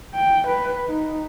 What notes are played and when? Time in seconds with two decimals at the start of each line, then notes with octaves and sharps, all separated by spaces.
0.15 G5
0.47 B4
0.87 D#4